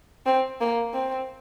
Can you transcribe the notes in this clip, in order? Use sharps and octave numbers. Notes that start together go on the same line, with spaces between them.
C4
A#3
C4